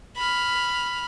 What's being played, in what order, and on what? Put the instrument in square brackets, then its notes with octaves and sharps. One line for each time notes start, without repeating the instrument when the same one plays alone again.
[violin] B5 F6